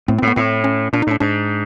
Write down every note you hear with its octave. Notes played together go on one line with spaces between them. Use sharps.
A2 C4
C4
A2
B3
A2 C4
C#4
A#2 D4
D#4
A2 D4
G#2 D4